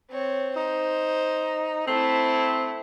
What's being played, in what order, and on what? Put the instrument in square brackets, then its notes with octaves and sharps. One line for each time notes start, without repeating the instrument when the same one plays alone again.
[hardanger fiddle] C4 C#5
[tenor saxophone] D#4 [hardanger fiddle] C5
[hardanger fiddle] A3 E4 [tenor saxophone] C4